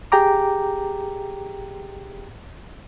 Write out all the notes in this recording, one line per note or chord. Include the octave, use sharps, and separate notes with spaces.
G4 G#4 G5 A#5 D6